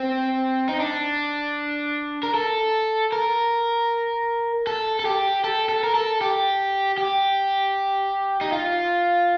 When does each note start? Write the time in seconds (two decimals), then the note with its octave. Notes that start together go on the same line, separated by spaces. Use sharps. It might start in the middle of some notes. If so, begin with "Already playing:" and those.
Already playing: C4
0.69 D#4
0.80 D4
2.23 A#4
2.34 A4
3.12 A#4
4.67 A4
5.00 A4
5.05 G4
5.44 A4
5.69 A4
5.83 A#4
5.95 A4
6.21 G4
6.98 G4
8.41 D#4
8.52 F4